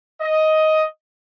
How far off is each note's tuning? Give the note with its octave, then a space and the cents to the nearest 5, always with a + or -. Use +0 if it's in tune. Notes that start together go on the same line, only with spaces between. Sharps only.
D#5 +10